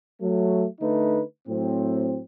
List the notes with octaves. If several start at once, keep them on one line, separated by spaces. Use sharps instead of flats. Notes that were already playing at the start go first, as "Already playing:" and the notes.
F#3 A3
D3 A3 D#4 B4
A2 F#3 C4